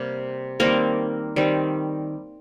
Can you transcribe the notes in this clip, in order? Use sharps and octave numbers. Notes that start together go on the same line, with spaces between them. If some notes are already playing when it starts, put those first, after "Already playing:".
Already playing: C3 G3 A#3
D#3 G3 A#3 C4 A#4
D#3 G3 C4